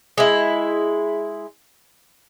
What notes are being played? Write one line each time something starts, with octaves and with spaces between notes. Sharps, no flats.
G#3 E4